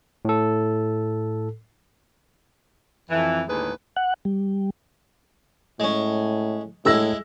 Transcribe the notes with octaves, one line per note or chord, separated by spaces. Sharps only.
A2 A4
F2 E3
D#2 A2 D3 G#3 G#4 B4
F#5
G3
A2 G#3 C#4
A2 G#3 E4 A4 E5 E6 A#6